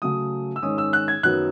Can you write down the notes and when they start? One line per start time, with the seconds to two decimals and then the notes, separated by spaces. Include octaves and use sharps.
0.02 C#3 F#3 A3 D#6
0.56 E6
0.62 G#2 D#3 G#3 C#4 D#6
0.78 E6
0.93 F#6
1.08 G#6
1.23 F#2 D#3 F#3 B3 F#6